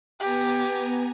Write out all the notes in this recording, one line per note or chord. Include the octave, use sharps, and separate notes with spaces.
B3 G4 G#5 A#5